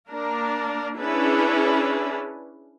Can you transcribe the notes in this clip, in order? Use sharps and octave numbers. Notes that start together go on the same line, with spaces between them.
A#3 D4 A#4
C#4 D4 E4 G#4 B4